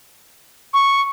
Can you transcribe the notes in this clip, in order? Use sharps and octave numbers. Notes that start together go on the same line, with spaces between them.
C#6